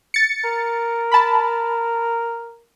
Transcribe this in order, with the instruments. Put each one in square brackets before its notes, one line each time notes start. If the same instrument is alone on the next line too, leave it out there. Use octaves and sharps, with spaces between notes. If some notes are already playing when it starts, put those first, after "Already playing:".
[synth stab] A6 C#7
[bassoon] A#4
[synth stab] A5 B5